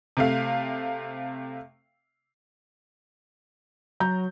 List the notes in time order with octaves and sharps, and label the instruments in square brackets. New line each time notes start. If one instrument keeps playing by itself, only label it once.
[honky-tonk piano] C3 A3 F5
[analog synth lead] F#3 [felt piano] A#5 G6